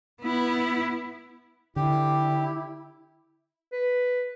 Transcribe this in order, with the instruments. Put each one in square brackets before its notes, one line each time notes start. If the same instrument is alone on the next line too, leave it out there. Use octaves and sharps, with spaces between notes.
[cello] B3 E4
[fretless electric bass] D3 [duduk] E4 [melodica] G4
[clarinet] B4